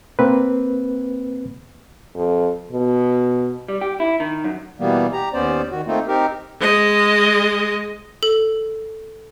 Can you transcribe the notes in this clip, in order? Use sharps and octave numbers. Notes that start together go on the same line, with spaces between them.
A#3 C4 B4
F2
B2
G3
G4
E4
D#3
F#2
B2 E3 G3 A#3 B3
G4 A#5
D#2 B3 C#4 C5 D5
D#3 F#4
A3 A#3 C4 D#4 F4
C4 D#4 G4 A#4
G#3 D#5
A4